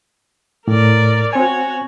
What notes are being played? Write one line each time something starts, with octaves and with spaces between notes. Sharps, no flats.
A2 A#4 D5
C4 F#4 C#5 G#5